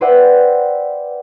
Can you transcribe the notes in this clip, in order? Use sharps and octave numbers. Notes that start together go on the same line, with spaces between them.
B4 C5 D5 E5 F#5 G5